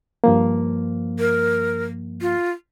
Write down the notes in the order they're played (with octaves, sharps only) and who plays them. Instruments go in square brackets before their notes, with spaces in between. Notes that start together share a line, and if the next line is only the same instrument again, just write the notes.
[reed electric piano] G2 F3 A#3
[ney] A#4
F4